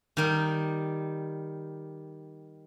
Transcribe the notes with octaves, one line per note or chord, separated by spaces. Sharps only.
D#3 G3 D#4